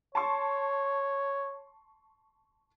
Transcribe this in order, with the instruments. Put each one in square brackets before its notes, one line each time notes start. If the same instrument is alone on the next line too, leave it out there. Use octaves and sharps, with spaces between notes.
[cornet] C#5 [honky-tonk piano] A5 C6 C#6